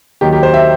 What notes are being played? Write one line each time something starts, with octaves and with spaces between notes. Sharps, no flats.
D#2 D#3 F#3 G4
G4
C5
E5